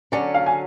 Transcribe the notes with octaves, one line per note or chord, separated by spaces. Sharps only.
D3 F#3 C#4 D5
F5
G#5